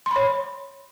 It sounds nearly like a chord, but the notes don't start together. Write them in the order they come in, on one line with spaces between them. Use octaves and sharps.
C6 B5 C#5